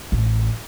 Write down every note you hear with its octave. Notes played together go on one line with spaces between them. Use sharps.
A1